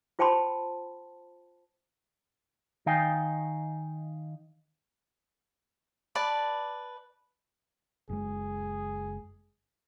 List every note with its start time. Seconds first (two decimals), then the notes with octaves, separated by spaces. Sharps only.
0.19 F4 C5 G5 A5 B5 C6
2.86 D#3 D#4 D#5 F5 G5 G#5
6.15 B4 D5 A5
8.09 F#1 G#3 G#4